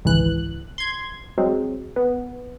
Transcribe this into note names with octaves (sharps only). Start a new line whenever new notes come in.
G#1 C#2 E3 F#6
C6 G#6
F#3 G#3 C4
B3